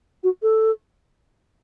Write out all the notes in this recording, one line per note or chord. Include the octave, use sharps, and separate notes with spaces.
F#4
A4